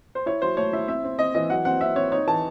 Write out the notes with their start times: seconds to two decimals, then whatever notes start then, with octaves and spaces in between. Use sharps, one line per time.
0.15 C5
0.26 E4 C#5
0.42 F#3 C5
0.57 A3 C#5
0.73 E4 E5
0.88 C4 E5
1.04 C4
1.19 C4 D#5
1.35 E3 D#5
1.50 F#3 F#5
1.65 C4 F#5
1.81 C4 E5
1.96 C4 C#5
2.12 D#4 C#5
2.27 E3 A5